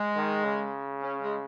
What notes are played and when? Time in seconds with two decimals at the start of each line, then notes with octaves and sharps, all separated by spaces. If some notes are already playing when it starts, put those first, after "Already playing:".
Already playing: G#3
0.16 D#3
0.45 C#3
1.03 C#4
1.22 G#3